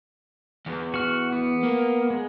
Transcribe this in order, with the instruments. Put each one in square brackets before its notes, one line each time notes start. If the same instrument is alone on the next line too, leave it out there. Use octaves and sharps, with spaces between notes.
[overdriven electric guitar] E2
[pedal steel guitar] F#4 F6
B3
[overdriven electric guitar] A#3
[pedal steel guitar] G#3